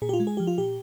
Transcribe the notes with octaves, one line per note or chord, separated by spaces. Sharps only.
A#2 G#4
G4
F4
G#3
G#4
F3 G4
F4
A#2 G4